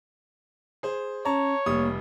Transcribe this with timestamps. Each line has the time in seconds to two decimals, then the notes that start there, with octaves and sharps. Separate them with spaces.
0.83 G#4 C5
1.25 C#4 C#5 A5 A#5
1.66 F1 G3 A#3 D#6